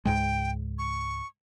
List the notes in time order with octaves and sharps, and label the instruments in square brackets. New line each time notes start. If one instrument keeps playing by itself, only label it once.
[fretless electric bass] C#2 G#2 G#3 [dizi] G5
[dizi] C#6